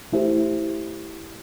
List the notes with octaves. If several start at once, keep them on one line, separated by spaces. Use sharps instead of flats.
A3 E4 G4 C5